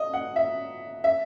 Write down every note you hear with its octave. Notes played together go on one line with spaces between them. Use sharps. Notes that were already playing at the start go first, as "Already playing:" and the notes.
Already playing: D#5
F#5
E5
E5